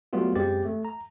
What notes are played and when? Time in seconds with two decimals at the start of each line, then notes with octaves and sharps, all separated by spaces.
0.13 F#3 G3 A3 B3 F4 F#4
0.35 F#2 G#3 C4 G4 A6
0.65 A3
0.85 A#5